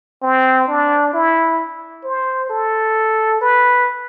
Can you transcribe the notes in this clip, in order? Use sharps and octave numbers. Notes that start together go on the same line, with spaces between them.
C4
D4
E4
C5
A4
B4